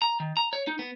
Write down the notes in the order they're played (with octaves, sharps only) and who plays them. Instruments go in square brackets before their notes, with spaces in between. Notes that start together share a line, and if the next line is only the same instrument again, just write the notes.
[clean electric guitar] A#5
D#3
A#5
C#5
D#4
B3